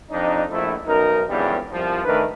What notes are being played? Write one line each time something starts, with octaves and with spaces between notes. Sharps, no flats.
F2 D4 D#4
A#1 F3 A3 E4
B1 F#2 D#4 A#4
G#1 E2 G2 C#3 F3 G3
C2 F3
D#3 A3 D4 A#4 B4